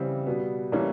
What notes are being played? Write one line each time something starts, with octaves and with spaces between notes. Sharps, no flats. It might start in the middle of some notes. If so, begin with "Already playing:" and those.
Already playing: C#3 E3 G3 C4
B2 G3 B3
A2 E3 G3 A#3 C#4